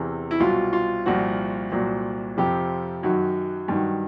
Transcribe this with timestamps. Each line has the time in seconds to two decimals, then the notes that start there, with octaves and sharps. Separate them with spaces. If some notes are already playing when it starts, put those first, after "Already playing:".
Already playing: E2 C3 E3
0.31 E4
0.40 C2 B2 F#3 F4
0.73 F4
1.06 C2 A#2 F3 F#4
1.72 C2 A#2 F#3
2.37 F2 C3 F3 G4
3.03 F#2 D#3 F#3
3.68 G2 D#3 F#3